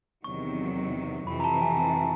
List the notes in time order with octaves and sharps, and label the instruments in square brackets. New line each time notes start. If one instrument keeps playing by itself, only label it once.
[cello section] E2 C3 D#3 F#3 [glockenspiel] C#6
[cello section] F2 C3 E3 [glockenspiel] B5
[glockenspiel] A#5
A5
G#5
A5